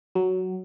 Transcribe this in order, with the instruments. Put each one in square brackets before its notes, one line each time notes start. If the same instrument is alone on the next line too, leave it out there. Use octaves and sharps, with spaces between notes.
[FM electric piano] F#3